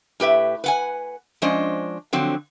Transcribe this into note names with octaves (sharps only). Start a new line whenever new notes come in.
A2 G4 B4 E5
B4 F#5 G#5
F3 G#3 C#4 D4 C5 D#5
D3 F3 F#3 C4